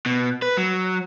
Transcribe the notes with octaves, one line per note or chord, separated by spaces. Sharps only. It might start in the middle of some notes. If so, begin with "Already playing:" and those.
B2
B4
F#3